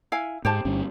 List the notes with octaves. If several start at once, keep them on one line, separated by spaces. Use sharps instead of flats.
E4 F5 G#5
G#2 G4 C5 A5
G1 G2 C#4